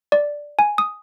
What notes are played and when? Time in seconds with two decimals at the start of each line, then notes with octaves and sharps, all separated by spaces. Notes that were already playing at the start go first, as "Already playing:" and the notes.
0.12 D5
0.59 G#5
0.78 D#6